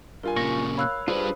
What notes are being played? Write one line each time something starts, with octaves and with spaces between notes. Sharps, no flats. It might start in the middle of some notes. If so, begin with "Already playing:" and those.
G2 F4 A#4 G#5
A#2 C#3 C#6 A#6
C#5 F5 B5 E6 F#6
G3 D4 F4 G#4 B4 C5